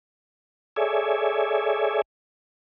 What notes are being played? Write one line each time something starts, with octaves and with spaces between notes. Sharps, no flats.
G#4 A4 C#5 D5 E5 G#5